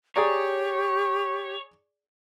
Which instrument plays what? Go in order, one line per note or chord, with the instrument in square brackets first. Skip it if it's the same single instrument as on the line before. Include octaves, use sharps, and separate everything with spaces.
[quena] G4 [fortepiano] G#4 D5 A#5 [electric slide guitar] C#5